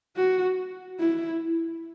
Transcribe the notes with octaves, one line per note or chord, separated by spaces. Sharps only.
F#4
E4